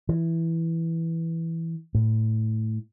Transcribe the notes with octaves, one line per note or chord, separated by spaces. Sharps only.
E3
A2